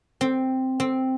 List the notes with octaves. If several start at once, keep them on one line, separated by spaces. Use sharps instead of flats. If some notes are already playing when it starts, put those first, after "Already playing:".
C4
C4